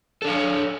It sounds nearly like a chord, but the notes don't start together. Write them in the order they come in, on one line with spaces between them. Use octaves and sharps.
A4 D4 F5 C#5